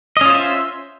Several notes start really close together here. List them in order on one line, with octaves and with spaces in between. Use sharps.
D#5 C#4 F4 C5 E5